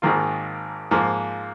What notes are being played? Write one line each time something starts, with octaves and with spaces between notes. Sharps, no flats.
G#1 G#2 D#3 A#3 F4
G#2 F3 A#3 F4